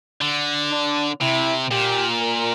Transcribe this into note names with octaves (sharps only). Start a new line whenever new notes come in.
D3
D4
C3 E4
A#2 G4
A#4